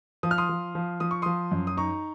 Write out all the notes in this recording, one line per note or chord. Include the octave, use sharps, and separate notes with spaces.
F3 D#6
F6
C6 D#6
F3
F3
F3 D#6
C#6
F3 C6 D#6
F#2
D#6
D#4 A#5 C#6